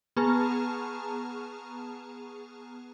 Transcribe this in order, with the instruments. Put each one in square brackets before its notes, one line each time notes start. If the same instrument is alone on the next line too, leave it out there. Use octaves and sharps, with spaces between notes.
[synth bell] B3 G#4 A5 A#5 C#6 F6